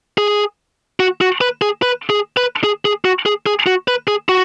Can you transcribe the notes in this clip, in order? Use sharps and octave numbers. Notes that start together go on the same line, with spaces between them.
G#4
F#4
F#4
B4
G#4
B4
G#4
B4
G#4
G#4
F#4
G#4
G#4
F#4
B4
G#4
F#4